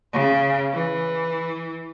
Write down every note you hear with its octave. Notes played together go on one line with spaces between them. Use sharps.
C#3
E3